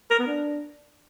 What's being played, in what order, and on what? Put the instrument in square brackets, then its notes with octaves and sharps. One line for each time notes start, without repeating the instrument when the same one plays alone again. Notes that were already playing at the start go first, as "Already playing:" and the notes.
[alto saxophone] A#4
B3
D4